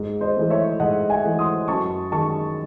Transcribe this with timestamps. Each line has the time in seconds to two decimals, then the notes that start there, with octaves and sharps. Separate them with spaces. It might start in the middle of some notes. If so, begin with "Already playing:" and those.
Already playing: G#2
0.21 C5 D#5
0.36 E3 A3
0.50 C#5 E5
0.80 G#2 D#5 F#5
1.09 E5 G#5
1.24 E3 A3
1.39 C6 D#6
1.68 F#2 A5 C#6
2.12 D#3 G#3 A5 C#6